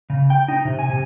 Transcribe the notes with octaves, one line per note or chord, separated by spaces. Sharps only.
C#3
G5
D#4
C3
G#5
C3